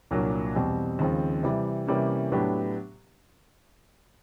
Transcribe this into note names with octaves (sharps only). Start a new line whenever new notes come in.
C2 A#2 F#3 A#3 D4
E2 B2 G3 C4
D#2 C#3 F3 G#3 C4
C3 E3 G3
C3 E3 G3 A#3 C#4
A2 F#3 B3 D4 G4